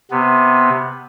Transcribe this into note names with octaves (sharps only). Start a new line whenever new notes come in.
C3 B3